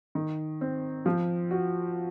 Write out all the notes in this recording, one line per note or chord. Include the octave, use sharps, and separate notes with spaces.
D#3
C4
F3
F#4